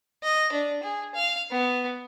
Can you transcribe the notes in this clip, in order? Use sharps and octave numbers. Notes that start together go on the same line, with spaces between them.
D#5
D4
G#4
F5
B3